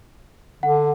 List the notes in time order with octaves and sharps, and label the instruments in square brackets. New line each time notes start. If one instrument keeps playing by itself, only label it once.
[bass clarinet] D3 [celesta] F#5